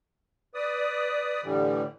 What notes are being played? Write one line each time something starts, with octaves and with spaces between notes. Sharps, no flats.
B4 D5 D#6
A2 D3 E3 G3